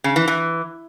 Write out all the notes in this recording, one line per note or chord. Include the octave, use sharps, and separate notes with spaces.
C#3
E3
E3